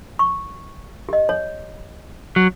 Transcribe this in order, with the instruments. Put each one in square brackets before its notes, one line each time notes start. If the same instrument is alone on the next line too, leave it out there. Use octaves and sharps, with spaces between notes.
[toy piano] C#6
G4 D#5
C#5
[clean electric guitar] F#3